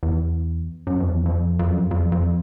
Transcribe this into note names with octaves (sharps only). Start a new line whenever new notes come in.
E2
F#2
F2
E2
F2
F2
F#2
F2
F2